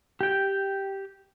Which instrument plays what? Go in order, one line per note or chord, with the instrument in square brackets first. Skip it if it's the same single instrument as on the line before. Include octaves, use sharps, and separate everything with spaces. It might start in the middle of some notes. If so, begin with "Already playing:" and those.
[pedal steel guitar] G4 G5